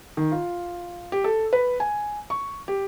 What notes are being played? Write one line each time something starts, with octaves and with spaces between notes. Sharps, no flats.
D#3
F4
G4
A4
B4
G#5
C#6
G4